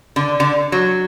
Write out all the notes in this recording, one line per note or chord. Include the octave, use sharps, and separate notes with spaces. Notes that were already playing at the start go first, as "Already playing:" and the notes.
D3
D3
F#3